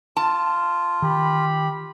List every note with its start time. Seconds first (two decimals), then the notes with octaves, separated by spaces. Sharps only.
0.17 F4 A5
1.02 D#3 G4 B5